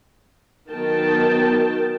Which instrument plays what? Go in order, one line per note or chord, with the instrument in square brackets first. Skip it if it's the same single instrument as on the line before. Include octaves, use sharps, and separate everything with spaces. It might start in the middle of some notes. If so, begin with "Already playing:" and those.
[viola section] D#3 F#3 B3 A#4 G5 A5